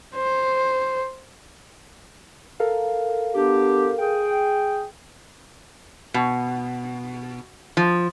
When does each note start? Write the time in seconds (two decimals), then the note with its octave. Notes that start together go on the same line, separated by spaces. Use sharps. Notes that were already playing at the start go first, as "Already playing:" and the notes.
0.15 C5
2.60 A4 A#4 F5
3.35 B3 D4 G4
3.99 G#4 G5
6.14 B2
7.77 F3